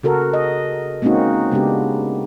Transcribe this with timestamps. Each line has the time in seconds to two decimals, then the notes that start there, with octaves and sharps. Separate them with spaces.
0.03 C#3 F#4 A4 A#4
0.33 D#5
1.02 G#3 A#3 C4 C#4 D#4 F#4
1.51 C#3 G#3 B3 D4 G4